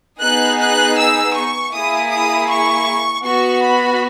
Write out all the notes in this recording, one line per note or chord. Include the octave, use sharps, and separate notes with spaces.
B3 D#4 G#4 F#6
F#6
E6
C#6
A#3 E4 G#4 D#6
D#6
C#6
B3 F#4 C#6
B5